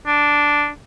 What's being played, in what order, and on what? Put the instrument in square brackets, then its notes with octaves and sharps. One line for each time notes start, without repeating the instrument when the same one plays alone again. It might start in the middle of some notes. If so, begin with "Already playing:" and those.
[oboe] D4